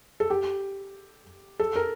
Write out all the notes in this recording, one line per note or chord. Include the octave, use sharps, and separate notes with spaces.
A4
G4
A4
A#4